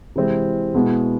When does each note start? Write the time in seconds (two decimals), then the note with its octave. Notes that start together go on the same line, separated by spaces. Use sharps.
0.16 C3 E3 G#3 C4 E4
0.74 B2 G#3 B3 E4